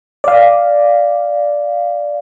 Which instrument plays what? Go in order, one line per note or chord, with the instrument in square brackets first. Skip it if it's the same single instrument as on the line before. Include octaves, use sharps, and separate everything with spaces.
[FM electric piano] D5 F5